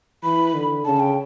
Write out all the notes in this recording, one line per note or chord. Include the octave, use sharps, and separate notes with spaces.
E3 B5
D3
C#3 A5
G5